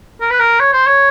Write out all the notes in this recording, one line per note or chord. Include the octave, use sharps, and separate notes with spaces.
A#4
B4
A#4
C#5
C5
C#5